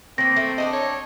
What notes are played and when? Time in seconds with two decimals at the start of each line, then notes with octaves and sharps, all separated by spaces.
0.18 D#3 A#3 C4 A#6
0.36 A3
0.58 D4 D#4 A4 D#5
0.73 C#5